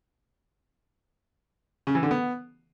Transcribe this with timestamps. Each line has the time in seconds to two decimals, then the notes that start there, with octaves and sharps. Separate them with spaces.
1.87 C#3
1.95 E3
2.03 D3
2.11 B3